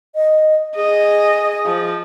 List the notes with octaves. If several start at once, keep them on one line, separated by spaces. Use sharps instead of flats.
D#5
G#4 D#5
F3